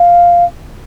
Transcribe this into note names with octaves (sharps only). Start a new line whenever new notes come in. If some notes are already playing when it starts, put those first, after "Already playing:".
Already playing: F5